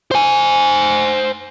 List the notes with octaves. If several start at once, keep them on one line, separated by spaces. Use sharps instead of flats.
C5 G#5